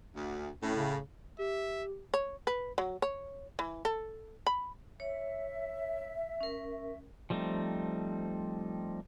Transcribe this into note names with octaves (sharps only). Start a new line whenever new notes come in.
D2
A2 C#4
C#3
G4 E5
C#5
B4
F#3
C#5
E3
A4
B5
C#5 E5
C#4 A#4
F3 G3 A3 C4 D#4